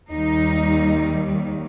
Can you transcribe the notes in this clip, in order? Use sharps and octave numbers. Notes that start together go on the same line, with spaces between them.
D#2 D#3 G3 D#4